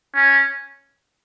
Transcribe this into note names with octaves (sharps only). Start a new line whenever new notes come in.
C#4